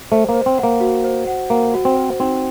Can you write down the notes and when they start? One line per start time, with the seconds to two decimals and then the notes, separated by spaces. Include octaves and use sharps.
0.11 A3 C5
0.29 A#3
0.34 C5
0.46 C4
0.58 F#5
0.63 A#3
0.80 F#4
1.04 C5
1.27 F#5
1.50 A#3 F#5
1.74 F#4
1.85 C4
1.96 C5
2.20 C4 D#4